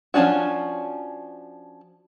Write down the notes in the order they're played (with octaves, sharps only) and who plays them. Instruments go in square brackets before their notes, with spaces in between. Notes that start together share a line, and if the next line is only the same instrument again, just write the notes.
[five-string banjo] F3 G#3 C#4 D4 F#4